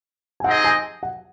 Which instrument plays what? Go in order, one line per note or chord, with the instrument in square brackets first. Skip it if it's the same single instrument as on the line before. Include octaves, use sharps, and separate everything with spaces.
[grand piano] G#5
[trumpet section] C4 D#4 G#4 D#5 [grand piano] F#5
[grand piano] G#5
F#5